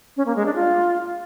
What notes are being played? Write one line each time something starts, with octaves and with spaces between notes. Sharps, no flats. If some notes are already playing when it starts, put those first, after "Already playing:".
C#4
A#3
G#3
D4
F4